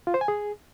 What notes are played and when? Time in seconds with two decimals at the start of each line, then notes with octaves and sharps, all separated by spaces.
0.07 F4
0.14 C5
0.21 G#5
0.28 G#4